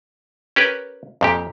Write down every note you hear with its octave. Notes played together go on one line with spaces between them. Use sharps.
C#4 G4 A#4 B4
F2 A#2 G4